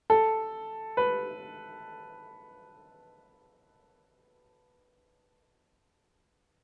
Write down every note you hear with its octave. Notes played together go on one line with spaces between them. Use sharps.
A4
B4